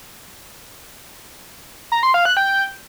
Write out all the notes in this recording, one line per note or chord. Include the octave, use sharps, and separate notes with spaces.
A#5
C6
F5
F#6
G5